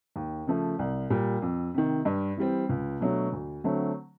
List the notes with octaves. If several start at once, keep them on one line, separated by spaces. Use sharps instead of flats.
D#2
C#3 F3 A3
C2
A#2 G3
F2
C3 D#3
G2
E3 G3 C4
C#2
B2 F#3 A3 D4
D2
D3 F#3 A3 C4